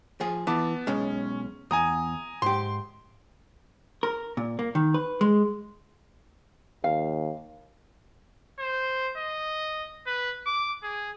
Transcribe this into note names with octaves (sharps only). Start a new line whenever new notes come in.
F3 G#4
E3 B3 A5 D6
B1 G#3 C#4
E2 G#5 A#5 D#6
G#2 G4 C6
A#4
A#2
A#3
D#3
B4
G#3
D#2 F5
C5
D#5
B4
D6
G#4